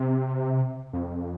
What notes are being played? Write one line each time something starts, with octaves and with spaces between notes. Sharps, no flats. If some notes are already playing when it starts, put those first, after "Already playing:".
Already playing: C3
F2